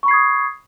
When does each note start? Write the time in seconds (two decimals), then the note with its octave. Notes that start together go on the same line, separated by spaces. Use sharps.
0.03 C#6
0.06 B5
0.08 C7
0.11 G#6
0.13 D#6